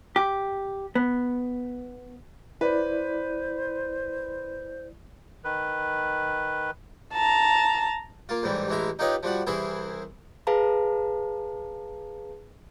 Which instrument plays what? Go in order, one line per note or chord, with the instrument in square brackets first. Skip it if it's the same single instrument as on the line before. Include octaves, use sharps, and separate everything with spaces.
[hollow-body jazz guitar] G4
B3
[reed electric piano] E4 D5 [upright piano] B4 [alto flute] C5
[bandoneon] D#3 B4
[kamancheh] A5 A#5
[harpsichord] A#3 F4
A1 G#2 E3 G3
A1 E3 G#3 E5 A#5
D#4 F4 G4 B4 C#5 D#5
F3 G3 F#4 F#5
C2 E3 E4 G#4 C5
[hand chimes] G#4 B4 F5 A5 A#5